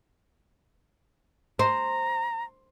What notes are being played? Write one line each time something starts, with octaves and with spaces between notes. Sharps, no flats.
C5 A#5